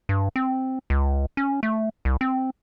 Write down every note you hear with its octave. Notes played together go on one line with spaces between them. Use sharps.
G2
C4
C#2
C#4
A3
C2
C4